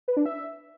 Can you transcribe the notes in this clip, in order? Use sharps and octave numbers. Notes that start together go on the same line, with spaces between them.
B4
D4
E5